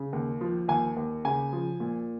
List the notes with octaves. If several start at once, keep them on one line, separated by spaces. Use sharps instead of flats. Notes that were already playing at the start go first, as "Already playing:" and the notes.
Already playing: C#3
D#2
F3
D#2 G#5
D#2
C#3 G#5
F3
A#2